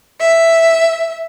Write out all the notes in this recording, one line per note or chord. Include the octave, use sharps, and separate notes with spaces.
E5